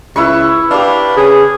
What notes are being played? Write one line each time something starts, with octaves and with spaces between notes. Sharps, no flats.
C#2 E4 B4 C#6
D4 G4 B4 F5
C#3 G#4